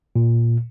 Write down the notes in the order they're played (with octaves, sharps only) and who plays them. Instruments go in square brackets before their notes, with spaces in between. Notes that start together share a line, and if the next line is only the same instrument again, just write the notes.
[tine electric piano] A#2